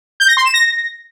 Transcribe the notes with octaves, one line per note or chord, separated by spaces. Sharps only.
G6
A#6
C6
E7
A#6